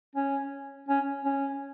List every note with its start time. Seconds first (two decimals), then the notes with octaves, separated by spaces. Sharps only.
0.15 C#4
0.89 C#4
1.25 C#4